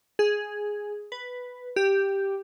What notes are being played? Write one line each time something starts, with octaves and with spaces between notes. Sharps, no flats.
G#4
B4
G4